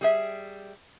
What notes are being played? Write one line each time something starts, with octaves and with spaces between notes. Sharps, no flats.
G3 G#4 E5